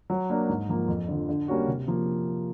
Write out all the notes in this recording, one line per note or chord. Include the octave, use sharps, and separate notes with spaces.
F#3
A#3 D4
G#2
F3 A#3
F2
D3 F3
D3
G3 A#3 C#4 F#4
C3
F3 A#3